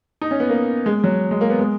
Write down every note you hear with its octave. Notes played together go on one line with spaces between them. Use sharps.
D#4
C#4
B3
A#3
G#3
F#3
G#3
A#3
B3
G#3